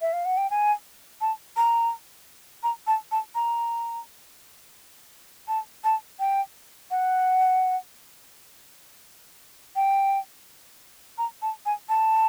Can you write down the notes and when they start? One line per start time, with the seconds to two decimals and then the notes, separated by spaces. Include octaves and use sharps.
0.02 E5
0.13 F5
0.25 F#5
0.37 G5
0.50 G#5
1.21 A5
1.57 A#5
2.63 A#5
2.87 A5
3.12 A5
3.35 A#5
5.48 A5
5.84 A5
6.20 G5
6.91 F#5
9.76 G5
11.18 A#5
11.42 A5
11.66 G#5
11.89 A5